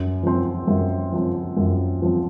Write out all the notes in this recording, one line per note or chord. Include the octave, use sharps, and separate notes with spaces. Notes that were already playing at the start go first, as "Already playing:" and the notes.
Already playing: F#2
F3 C4
F#2
F3 C4
F#2
F3 C4